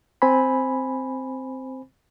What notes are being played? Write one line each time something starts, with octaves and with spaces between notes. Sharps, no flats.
C4 C5 G#5 B5